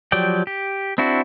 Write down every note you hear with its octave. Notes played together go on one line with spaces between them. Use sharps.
F3 F#3 G4 D5 G5
G4
C4 D4 E4 F#4